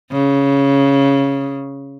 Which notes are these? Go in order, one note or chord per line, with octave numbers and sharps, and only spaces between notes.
C#3